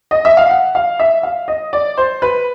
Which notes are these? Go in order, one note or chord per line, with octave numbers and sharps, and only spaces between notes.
D#5
E5
F5
F#5
F5
E5
F5
D#5
D5
C5
B4